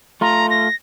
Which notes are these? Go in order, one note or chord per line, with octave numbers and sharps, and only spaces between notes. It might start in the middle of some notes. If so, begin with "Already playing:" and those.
A3 F4 A#5
A#6